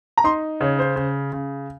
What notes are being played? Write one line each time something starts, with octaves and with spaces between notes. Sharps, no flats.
A#5
D#4 C6
C#3 C#5
C5
C#3
C#3